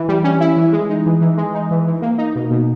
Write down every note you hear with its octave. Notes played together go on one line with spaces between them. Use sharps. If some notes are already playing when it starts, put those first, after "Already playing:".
Already playing: E3
G3
C#4
E4
E3
G#3
D#4
E3
E3
G#3
D#4
E3
E3
A#3
D#4
B2
B2